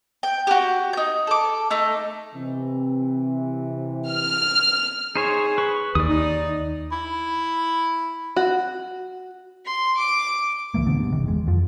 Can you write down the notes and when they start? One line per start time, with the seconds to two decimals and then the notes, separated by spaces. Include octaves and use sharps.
0.23 G5
0.47 F#4 G4
0.93 D#4 G6
1.27 A4 D6
1.70 A3 D#4
2.34 C3 E3
4.08 F6
5.16 D#4 G#4 C5 C#5
5.58 B4 C#6
5.95 D#2 D5 D#6
6.09 D#4
6.92 E4
8.36 F#4
9.66 C6
9.98 D6
10.74 C#2 E3 A3 A#3
10.87 B2 D3 B3 D4
11.00 G2
11.13 G1 C3 D#3
11.28 E2 G#3
11.47 F2 F3